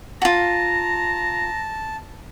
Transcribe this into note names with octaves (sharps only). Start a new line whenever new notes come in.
F4 F#4 A5 A#5